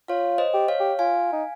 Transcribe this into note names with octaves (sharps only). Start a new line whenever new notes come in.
F4 C#5 F5
C5 D#5
G4
C#5 F5
G4
F4 F5 G#5
D#4